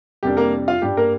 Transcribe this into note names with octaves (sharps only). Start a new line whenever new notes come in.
F2 C3 G3 A#3 D4 G4
A#3 A#4
F4 F5
G2 G3 D4 G4
A#3 A#4